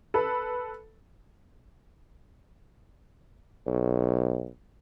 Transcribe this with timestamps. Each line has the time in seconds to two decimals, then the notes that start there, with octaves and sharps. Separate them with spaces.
0.14 A4 B4
3.67 B1